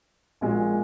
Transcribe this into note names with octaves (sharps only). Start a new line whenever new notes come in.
A#1 A#2 G#3